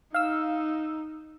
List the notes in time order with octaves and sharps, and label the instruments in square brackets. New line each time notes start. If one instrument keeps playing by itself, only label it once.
[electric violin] D#4 [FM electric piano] F5 E6